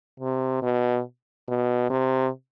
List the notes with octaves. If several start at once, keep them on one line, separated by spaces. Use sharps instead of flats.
C3
B2
B2
C3